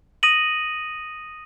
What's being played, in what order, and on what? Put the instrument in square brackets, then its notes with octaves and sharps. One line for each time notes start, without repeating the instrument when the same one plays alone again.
[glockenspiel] D#6 A#6 D#7 F#7